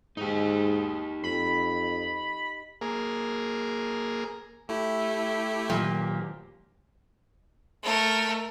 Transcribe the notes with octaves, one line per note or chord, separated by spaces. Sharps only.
G#2 D#4 G4
F2 B5
A#3 G#4 A#4
A3 E4 G4
A#2 D#3 F#3
A3 A#4